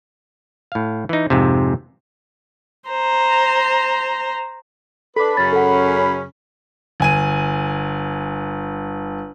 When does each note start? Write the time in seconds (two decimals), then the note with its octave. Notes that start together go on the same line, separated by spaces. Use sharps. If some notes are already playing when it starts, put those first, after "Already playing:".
0.72 A2 F5
1.09 E3 D#4
1.30 F2 G#2 C3
2.90 C5 A#5
5.16 D4 A4 B4 B5
5.37 F#2 C#3 C#4 A6
5.53 A4 F#5
7.00 G1 G#5 D#7